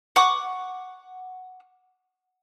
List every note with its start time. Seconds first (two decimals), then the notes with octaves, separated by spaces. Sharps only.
0.16 F#5 C#6 D6